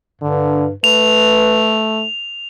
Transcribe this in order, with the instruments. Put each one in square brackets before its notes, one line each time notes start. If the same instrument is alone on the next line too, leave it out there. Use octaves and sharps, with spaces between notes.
[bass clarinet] G2 [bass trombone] D3
[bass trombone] A3 [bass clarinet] B4 [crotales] F7